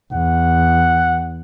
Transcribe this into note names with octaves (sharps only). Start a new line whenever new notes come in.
E2 F#5